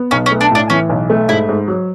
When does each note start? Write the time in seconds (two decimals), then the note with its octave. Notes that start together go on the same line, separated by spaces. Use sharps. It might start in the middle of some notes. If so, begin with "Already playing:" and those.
Already playing: B3
0.11 B1 C#4
0.26 C#4
0.31 A3
0.41 D4
0.51 A2 D4
0.70 E3 C#4
0.89 B1
1.10 A3
1.29 G#2 E4
1.49 G#2
1.68 F#3